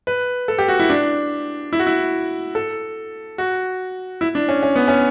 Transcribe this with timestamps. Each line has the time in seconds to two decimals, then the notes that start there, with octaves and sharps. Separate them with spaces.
0.07 B4
0.48 A4
0.58 G4
0.68 F#4
0.80 E4
0.90 D4
1.73 E4
1.79 F#4
1.87 E4
2.55 A4
3.38 F#4
4.21 E4
4.35 D4
4.49 C#4
4.63 C#4
4.76 B3
4.88 C#4